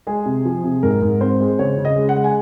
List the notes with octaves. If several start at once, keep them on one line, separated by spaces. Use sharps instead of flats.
G#3 G#4
C3
F3
C3
G#2 A#4
G#2
C4 C5
G#3
C#3 C#5
C#3
D#5
G#3
F#5
G#3
G#5